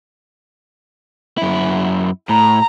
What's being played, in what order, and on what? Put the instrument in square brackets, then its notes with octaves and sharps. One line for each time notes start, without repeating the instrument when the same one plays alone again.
[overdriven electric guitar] F#2 E4
[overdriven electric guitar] A2 [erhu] A#5